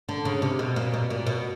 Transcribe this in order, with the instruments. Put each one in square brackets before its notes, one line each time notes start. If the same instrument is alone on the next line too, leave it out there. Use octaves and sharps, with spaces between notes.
[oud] D3
C#3
C3
B2
A#2
B2
A#2
B2